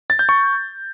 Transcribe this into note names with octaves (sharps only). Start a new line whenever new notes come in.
A6
G6
C#6